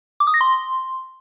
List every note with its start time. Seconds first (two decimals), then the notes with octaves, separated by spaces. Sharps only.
0.20 D6
0.27 D#6
0.34 A#6
0.41 C6